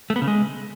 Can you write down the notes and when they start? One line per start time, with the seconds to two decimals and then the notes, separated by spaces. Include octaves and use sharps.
0.10 A3
0.16 B3
0.22 C#3
0.28 G#3